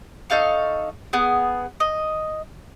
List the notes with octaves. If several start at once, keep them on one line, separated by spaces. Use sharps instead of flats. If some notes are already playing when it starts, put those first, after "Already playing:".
D#4 A4 F5 C#6
B3 G#4
D#5